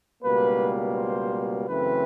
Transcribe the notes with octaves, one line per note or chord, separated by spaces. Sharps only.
C#2 B2 G3 A#3 B4
C5
F#2 C#3 E3 A3 C4 B4